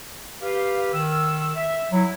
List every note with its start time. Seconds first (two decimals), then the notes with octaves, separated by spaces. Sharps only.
0.41 G4 B4 F5
0.93 D#3 E6
1.55 E5
1.92 F#3 E4